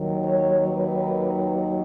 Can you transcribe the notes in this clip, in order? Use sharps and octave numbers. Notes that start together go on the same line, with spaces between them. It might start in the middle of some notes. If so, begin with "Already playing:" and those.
Already playing: D#2 D#3 F#3
C#5
B4